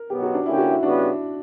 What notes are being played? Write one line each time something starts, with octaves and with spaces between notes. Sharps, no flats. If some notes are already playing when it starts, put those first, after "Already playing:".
Already playing: A#4
B2 F#3 B3 G4
F#4
D4
D3 A#3 C#4 E4 G4
F#4
E4
C#3 G3 B3 D4 F#4